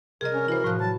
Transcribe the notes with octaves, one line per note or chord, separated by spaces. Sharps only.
C3 G3 G#4 A#4 D#5
C#4
E3 E4 F#4 C5 B5
A2 F3 F#6
E3 F#3 A5